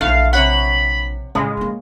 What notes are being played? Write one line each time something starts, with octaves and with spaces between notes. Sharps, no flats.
A#1 E3 A3 F5
C3 C#5 F#5 B5
A2 C#3 G#3
A3 A#3